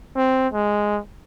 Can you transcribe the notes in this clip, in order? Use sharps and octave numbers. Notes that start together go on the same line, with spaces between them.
C4
G#3